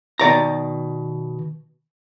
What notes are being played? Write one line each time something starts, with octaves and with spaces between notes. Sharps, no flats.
B2 D#3 D5 A#5